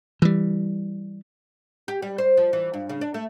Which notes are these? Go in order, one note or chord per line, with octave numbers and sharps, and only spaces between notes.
E3 G3
G4
G3
C5
F3
E3
G2
C#3
D4
A3